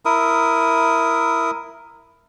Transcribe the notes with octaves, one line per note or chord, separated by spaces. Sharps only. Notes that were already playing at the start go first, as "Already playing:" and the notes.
E4 A#4 D#6